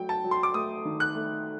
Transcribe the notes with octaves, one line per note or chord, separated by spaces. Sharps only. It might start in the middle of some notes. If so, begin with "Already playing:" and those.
Already playing: F#3 A3 G5
A5
F#3
C6
D6
A3 D#6
D#3
F#6
A3